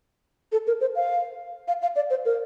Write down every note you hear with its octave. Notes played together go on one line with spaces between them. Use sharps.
A4
A#4
C5
F5
F5
F5
D5
C5
A#4